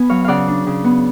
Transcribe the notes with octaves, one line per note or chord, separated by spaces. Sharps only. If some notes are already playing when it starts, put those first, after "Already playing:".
Already playing: B3 G#5 B5
F#3 C#5 F5
C#3 D5 F5 F#5
D4
C#3
B3